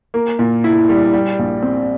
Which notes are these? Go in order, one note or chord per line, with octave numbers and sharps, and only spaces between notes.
A#3
A#2
E4
G3
G3
A#1
C4